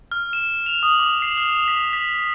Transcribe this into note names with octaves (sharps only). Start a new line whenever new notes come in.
F6
E7
F7
D#6
D6
C7
F6
B6
B6